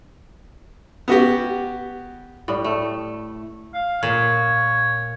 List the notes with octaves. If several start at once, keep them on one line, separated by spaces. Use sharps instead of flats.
B3 F#4 G4
A2 G3
A3
F5
A#2 C#5